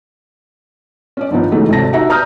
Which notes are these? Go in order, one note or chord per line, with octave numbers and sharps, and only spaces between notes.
C#4 D4 D5
G2 D#3 F3 B3 D#4
C#3 E3 G#3 A3 D#4 F#4
G#1 D2 C3 D4 A5 A#6
D#4 F#4 G4 E5 F#5 A#5
B4 D5 A#5 D#6 F6 G6